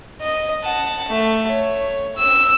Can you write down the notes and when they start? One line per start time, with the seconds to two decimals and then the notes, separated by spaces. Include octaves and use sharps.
0.21 D#5
0.64 F#5 A5
1.08 A3
1.47 C#5
2.17 E6